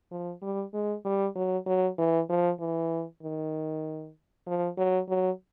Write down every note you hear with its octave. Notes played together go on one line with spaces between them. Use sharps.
F3
G3
G#3
G3
F#3
F#3
E3
F3
E3
D#3
F3
F#3
F#3